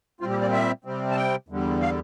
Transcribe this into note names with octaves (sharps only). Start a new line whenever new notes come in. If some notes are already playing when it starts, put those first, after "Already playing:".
A#2 G3 C4 F4
G4
D5
E5
C3 G3 C4
A5
G5
E2 D3 G3
F5